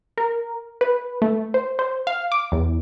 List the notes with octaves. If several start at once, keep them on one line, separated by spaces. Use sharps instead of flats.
A#4
B4
A3
C5
C5
F5
D6
E2